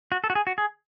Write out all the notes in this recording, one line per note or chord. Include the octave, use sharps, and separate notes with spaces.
F#4
A4
F#4
G#4
F#4
G#4